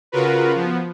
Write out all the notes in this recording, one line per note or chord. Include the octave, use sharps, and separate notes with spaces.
C#3 F4 F#4 A#4 B4
F3 B3